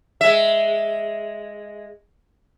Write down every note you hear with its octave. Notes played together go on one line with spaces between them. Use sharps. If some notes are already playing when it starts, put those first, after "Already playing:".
G#3 E5